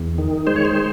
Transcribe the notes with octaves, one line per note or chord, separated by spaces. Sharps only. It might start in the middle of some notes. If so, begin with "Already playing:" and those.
Already playing: E2
D#3
G#3 C5
C#5
C5
G#3